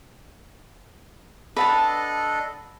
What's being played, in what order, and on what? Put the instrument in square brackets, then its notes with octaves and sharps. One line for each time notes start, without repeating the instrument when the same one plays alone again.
[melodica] D4 A4 D#5 [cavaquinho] B4 F#5 A5